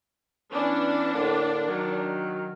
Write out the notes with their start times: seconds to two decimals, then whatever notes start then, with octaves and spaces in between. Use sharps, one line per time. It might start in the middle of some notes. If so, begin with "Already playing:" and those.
0.53 E3 B3 C#4 D4
1.14 A2 D3 A#3
1.67 D#3 F#3